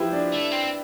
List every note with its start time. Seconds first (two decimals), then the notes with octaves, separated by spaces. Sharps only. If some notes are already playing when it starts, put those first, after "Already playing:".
Already playing: F3 E4 G4 B4
0.12 D4
0.32 A3
0.52 C4